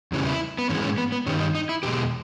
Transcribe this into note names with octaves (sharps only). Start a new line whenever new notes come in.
E2 C#3 E3 G3
E4
B3
G#2 E3 G#3 C#4
C#4
B3
B3
G2 D#3 G3 C#4
D#4
D#4
E4
E2 B2 G#3 G4